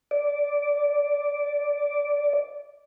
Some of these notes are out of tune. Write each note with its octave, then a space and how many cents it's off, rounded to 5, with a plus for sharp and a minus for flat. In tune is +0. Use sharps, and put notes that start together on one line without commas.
D5 -10